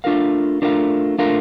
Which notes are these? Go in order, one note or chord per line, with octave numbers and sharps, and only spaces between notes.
A3 D4 F4 A#4 F5
A3 D4 F4 A#4 F5
A3 D4 F4 A#4 F5